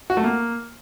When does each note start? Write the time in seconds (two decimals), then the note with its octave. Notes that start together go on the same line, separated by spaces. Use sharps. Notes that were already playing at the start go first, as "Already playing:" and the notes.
0.10 F#4
0.17 A3
0.24 A#3